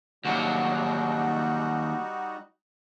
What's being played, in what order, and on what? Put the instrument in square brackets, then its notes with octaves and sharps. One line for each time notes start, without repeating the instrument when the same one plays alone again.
[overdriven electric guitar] D#2 F#3 [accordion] G3 D#4 F#4